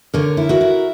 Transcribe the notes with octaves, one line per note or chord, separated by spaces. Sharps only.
D3 A#4 C#5
E4
F#4 A#4
E4